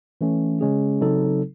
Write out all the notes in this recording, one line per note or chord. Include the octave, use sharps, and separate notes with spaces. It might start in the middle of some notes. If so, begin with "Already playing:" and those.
E3 A3 C#4
C#3 G#3 C#4 G#4
C#3 F#3 C4 D#4 A4